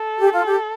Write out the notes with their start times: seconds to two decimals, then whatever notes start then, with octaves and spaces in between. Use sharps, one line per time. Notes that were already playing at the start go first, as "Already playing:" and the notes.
Already playing: A4
0.19 G4
0.33 F4
0.46 G4